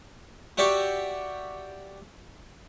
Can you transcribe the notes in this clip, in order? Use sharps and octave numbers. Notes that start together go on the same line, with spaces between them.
F#4 G4 D5 E5 G5 C#6